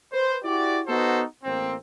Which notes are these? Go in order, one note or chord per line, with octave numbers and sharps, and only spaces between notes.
B4 C5
E4 F#4 G4 D5
B3 D#4 F#4 A4 C5
A1 A#3 C4